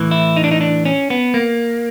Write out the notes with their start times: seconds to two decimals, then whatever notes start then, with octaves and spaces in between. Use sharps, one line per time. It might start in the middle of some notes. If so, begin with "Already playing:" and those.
Already playing: A2 E3
0.11 E4
0.37 D#4
0.44 D4
0.51 D#4
0.61 D4
0.85 C#4
1.10 B3
1.34 A#3